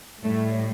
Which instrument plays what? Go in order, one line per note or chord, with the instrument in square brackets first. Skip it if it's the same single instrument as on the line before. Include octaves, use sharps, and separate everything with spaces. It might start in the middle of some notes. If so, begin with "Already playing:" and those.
[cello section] A2 G3 A3